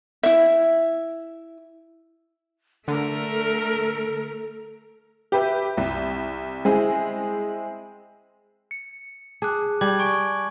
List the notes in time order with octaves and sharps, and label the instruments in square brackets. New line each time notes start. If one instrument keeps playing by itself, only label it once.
[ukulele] E4 E5
[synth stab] D3 [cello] A3 A#4 [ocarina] A4
[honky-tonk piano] G4 B4 E5 G5
C2
G#3 C4 E4 G#4
[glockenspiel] C#7
[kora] G#4 [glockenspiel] A5 D6 F#6
[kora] G3 [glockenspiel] D6 G#6 F#7
[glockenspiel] G#5 C#6 D7